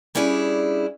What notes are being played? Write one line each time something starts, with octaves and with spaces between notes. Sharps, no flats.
G3 C#4 D4 E4 G#4